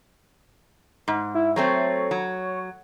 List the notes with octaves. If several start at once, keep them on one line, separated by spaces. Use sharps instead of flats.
G#2
E4
F#3 A3 C4 C#5
F#3